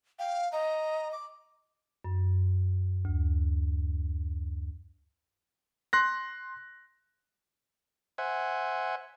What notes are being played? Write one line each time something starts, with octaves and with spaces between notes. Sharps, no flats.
F5 G5
D#5 A#5
D6
F#2
D2
C6 F#6 A#6
C5 E5 F#5 G#5